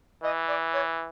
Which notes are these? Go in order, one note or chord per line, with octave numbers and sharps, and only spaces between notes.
E3 D#5
D5
C#5